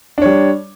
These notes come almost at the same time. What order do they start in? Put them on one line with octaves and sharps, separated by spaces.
D4 C#5 G3